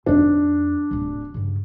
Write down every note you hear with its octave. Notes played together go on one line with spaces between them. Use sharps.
F2 D4 D#4
D1 D3
G2 C#3